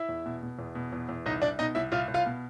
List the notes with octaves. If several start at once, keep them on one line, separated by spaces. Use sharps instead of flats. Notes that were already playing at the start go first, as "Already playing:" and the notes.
Already playing: E4 E5
E2
B2
B2
E2
B2
E2
E2
C2 D#4 D#5
C2 D4 D5
B2 D#4 D#5
C2 E4 E5
C2 F4 F5
C2
F4 F5
B2